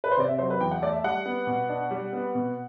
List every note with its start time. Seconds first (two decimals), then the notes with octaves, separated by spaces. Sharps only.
0.04 B4
0.11 C5
0.17 C3 D5
0.28 E5
0.38 F#3 C5
0.50 B4
0.60 E2 G5
0.71 F#5
0.82 A3 D5
0.93 E5
1.04 G3 F#5
1.26 B3
1.47 B2
1.69 D4
1.91 G3
2.13 B3
2.35 B2